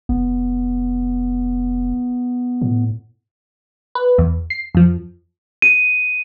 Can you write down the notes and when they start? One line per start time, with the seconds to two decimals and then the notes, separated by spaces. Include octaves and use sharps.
0.09 F1 B3
2.62 A2
3.95 B4
4.18 E2
4.50 C7
4.75 F2 F3
5.62 D#7